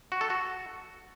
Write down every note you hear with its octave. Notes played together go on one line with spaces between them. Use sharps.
F#4
A4
F#4